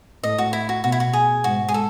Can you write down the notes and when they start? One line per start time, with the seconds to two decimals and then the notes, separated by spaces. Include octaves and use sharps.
0.23 A2 D#5
0.38 F#4
0.53 E4
0.69 F#4
0.84 B2 F#4
0.92 E4
1.00 F#4
1.13 G#4
1.44 G#2 F#4
1.68 G#4
1.74 A4